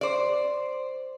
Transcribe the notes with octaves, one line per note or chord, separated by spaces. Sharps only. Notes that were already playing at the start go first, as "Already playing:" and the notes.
C5 D5